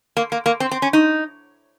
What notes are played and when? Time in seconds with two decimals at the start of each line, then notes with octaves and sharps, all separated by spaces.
0.17 A#3
0.32 A#3
0.46 A#3
0.60 C4
0.72 C4
0.82 C#4
0.93 D#4